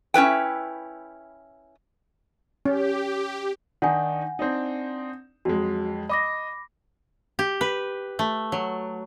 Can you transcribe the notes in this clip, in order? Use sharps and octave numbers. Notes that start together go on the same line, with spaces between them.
C#4 E4 B4 G5
C#4 G4
D#3 D4 D#4 F#5 G#5
C4 D4 D#4
F2 F#3 G#3 F#4
D#5 B5 D6 A#6
G4
B4
A3
F#3